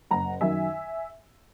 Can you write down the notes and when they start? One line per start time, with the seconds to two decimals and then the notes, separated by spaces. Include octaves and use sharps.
0.11 F#1 F#5 A#5
0.41 F#2 D#3 F#3 E5 G#5